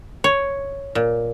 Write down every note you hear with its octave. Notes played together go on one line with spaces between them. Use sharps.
C#5
A#2